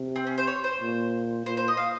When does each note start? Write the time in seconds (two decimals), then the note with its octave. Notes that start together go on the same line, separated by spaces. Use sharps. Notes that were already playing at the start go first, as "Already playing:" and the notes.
Already playing: C3
0.16 C4
0.27 C#4
0.38 C5
0.47 C#5
0.64 C5
0.81 A#2
1.45 A#2 C5
1.57 C5
1.68 D#5
1.77 F5